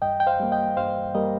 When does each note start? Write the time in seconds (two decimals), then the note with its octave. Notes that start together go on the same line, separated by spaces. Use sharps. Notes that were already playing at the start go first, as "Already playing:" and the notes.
0.02 G2 D#5 G5
0.20 G5
0.27 C5 F5
0.40 G3 A#3
0.52 D#5 G5
0.77 G2 C5 F5
1.15 G3 A#3 A#4 D#5